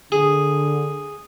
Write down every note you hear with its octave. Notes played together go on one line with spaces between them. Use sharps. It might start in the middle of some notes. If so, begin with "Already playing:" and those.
D3 G#4